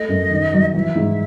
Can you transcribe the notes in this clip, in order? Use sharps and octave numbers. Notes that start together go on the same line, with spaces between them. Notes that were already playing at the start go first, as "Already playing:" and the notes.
Already playing: A3 D#5
F#2
D#3
F#3
E3 E5
G#2